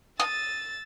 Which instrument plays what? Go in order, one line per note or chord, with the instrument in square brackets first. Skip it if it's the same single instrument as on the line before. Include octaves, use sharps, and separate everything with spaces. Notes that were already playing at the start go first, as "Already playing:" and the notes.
[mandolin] D#6 [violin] E6 A6